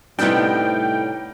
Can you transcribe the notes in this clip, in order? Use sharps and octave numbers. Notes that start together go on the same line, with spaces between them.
A2 C3 G3 B3 D4 D#4 G5